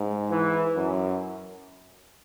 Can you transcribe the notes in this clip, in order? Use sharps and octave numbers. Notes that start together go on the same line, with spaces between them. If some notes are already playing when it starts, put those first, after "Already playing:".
Already playing: G#2
E3
F#2